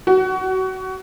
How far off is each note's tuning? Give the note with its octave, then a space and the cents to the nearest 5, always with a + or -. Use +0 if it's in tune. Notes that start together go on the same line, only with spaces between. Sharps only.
F#4 +25